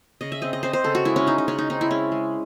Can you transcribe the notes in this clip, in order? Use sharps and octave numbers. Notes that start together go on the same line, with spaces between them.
C#3 D#5
E5
C4 D#5
D#5
C4 C5
C5
C#3 A4
F#4
G#3 E4
C#4
G#3 D#4
D#4
C#3 C#4
D#4
C4 D#4
E4
G#3 C#4
G#3